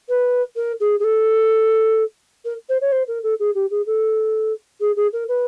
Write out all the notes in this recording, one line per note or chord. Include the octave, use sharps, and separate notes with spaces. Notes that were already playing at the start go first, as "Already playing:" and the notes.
B4
A#4
G#4
G#4
A4
A#4
C5
C#5
C5
A#4
A4
G#4
G4
G#4
A4
G#4
G#4
A#4
B4